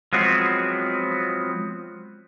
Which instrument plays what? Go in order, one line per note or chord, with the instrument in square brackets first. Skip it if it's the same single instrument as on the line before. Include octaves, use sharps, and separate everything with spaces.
[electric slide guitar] F3 F#3 G#3 B3 C4